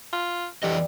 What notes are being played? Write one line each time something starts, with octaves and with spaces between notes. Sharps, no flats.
F4
F2 D3 E3 G3 D#5